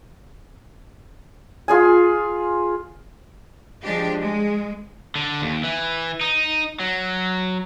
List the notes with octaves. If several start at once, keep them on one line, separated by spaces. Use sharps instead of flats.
F4 G#4 G#5
F3 G#3 D4 G4
G#3
D3
D#2
E3
D#4
F#3